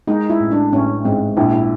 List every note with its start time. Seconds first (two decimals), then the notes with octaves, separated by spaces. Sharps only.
0.08 G#3 D#4
0.30 E4
0.40 A1
0.51 D4
0.73 A1 C#4
1.04 G#2 C4
1.37 A#1 E4
1.54 E4